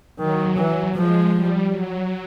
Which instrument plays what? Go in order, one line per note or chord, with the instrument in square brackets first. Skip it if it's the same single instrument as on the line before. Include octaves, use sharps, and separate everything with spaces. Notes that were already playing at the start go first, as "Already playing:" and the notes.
[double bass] D#3 [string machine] F#3
[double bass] E3
[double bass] F3 [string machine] G#3
[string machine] G3
F#3